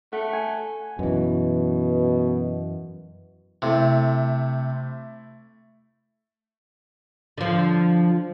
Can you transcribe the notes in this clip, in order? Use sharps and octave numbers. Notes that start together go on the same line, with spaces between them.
A3 F#5
G#5
F#2 B2 E3
C3 A3 E4
D3 F3